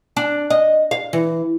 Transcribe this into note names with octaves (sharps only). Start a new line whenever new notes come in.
D4
D#5
F5
E3